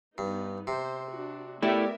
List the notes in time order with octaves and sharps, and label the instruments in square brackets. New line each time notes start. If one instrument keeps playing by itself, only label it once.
[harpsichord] G2 [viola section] B3 D#4
[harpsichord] C3 [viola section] C5
[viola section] D4 F#4
[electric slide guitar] A3 E4 [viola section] B3 A#4 E5 [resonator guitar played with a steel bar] G4 D5